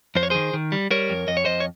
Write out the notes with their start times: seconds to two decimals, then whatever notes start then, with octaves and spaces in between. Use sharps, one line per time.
0.15 F2 C5
0.23 C#5
0.30 D#3 G#4 C5
0.53 D#3
0.72 G3
0.91 G3 A#4 C#5
1.10 F2
1.28 F2 D#5
1.37 C#5
1.45 F2 C5 D#5
1.60 C#5